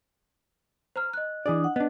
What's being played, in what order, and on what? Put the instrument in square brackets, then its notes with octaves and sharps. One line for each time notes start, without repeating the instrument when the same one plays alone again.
[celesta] C5 A#5 F6
D#5 F#6
[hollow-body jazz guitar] E3 G#4 D5 [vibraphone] D4 D#6
[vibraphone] F#5
[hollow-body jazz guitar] B3 D4 [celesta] D#5